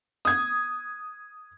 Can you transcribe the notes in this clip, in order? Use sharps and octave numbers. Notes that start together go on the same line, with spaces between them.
D#6 G#6